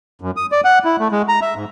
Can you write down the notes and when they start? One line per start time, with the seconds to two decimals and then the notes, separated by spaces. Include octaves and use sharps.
0.21 F#2
0.37 D#6
0.52 D5
0.65 F#5
0.85 E4
1.00 A3
1.12 G#3
1.28 A#5
1.42 E5
1.56 G#2